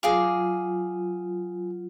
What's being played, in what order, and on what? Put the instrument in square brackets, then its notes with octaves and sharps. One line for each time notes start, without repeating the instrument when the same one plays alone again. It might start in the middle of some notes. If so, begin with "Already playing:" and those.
[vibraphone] F#3 F4 [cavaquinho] G#4 F5 D6